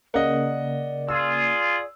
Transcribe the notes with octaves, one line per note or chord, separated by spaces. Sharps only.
C#3 A#3 D5 D#5 F#5
F4 G#4 E6